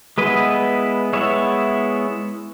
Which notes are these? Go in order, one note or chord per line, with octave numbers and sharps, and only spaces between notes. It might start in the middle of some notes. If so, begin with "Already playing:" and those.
G#3 B3 E4 B4 D#5
G#3 B3 E4 C#5 E5